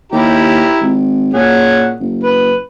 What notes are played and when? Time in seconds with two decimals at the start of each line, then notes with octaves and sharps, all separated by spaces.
0.12 D#2 E4 G4 A#5
0.81 G#1
1.34 A#2 C#4 G#4 F#5
2.00 F#1
2.24 B4